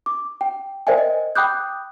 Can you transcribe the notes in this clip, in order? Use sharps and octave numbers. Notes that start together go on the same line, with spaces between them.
D6
G5
A#4 C5 D5 E5 G5 G#5
D#5
G5 B5 D6 D#6 F#6 G6